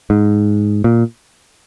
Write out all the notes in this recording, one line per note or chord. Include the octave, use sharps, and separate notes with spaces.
G#2
A#2